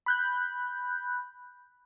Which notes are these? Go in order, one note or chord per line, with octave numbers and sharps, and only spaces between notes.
B5 F#6 G6